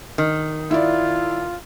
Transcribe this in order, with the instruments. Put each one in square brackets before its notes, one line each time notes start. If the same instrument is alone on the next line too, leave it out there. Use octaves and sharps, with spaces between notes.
[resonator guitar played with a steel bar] D#3
[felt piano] E4 D5 [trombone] F4